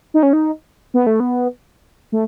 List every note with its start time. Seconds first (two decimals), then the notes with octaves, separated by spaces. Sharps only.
0.14 D#4
0.23 C#4
0.33 D#4
0.94 B3
1.07 A3
1.20 B3
2.12 A3